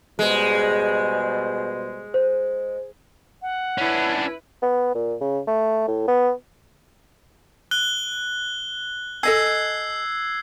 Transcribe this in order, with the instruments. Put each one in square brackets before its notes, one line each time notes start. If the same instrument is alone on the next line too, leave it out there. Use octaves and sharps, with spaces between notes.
[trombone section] B2 G3 C5 [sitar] G#3
[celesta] C5
[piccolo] F#5
[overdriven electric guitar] C#4 D4 [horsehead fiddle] E4 B4
[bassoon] B3
A#2
C#3
A3
A2
B3
[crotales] F#6 G7
[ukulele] A4 D#5 G#5 [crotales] E6 G#6 C7